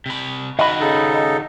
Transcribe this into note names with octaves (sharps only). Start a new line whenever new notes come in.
C3 B5
D#3 F#4 D#5 B5
C#3 D#4 A4